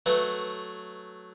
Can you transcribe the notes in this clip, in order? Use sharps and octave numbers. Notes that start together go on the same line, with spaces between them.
F#3 A3 B4